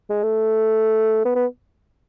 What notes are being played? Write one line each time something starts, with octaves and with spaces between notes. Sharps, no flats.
G#3
A3
B3
B3